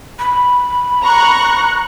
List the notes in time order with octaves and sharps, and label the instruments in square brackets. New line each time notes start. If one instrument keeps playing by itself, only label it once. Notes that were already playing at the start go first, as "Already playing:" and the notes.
[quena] B5
[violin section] A#5 C#6 F#6